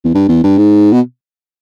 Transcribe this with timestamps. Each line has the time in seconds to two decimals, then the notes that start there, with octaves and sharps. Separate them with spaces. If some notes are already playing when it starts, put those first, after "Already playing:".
0.04 E2
0.14 G2
0.28 E2
0.43 G2
0.58 G#2
0.92 B2